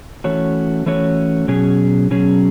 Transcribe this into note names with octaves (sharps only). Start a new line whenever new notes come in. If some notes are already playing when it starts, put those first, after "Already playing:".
E3 A3 C#4 F#4 C#5
E3 A3 C#4 F#4 C#5
B2 F#3 C#4 G#4
B2 F#3 C#4 G#4